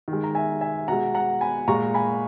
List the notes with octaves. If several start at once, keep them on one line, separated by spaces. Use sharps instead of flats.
D#3
G#3
A#5
E5 G#5
E5 G#5
B2 G#3 F#5 A#5
F#5 A#5
G#5 B5
A#2 G#3 A#5 C#6
G#5 B5